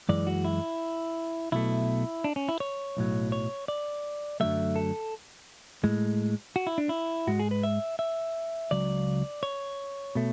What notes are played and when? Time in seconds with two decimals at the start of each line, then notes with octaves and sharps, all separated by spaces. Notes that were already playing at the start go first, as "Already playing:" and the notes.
0.09 F#2 E3 G#3 D5
0.27 F#4
0.45 E4
1.52 B1 B2 A3 E4
2.24 D4
2.36 C#4
2.49 E4
2.60 C#5
2.97 B1 A2 F#3
3.32 C#5
3.68 D5
4.40 F#2 D3 F#3 A3 E5
4.76 A4
5.84 A2 G#3
6.56 F#4
6.67 E4
6.78 D4
6.89 E4
7.27 G#2 G#3 F#4
7.39 G#4
7.51 B4
7.63 E5
7.99 E5
8.71 C#2 C#3 F#3 D5
9.43 C#5
10.15 B2 A3